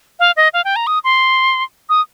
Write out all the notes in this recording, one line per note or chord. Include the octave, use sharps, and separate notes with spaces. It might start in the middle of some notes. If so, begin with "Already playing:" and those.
F5
D#5
F5
G5
A#5
D#6
C6
D#6